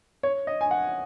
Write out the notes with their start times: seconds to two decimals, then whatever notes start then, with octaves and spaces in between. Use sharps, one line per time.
0.23 C#5
0.47 D#5
0.61 G#5
0.71 F#5